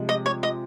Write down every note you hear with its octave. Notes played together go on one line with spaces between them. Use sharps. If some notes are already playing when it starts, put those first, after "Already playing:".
Already playing: C3 F3 G#3
D#5
C#5
D#5